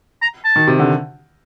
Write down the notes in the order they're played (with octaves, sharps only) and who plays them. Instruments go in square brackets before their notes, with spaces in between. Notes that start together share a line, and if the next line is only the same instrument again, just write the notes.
[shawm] A#5
A5
[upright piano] D#3
C3
D3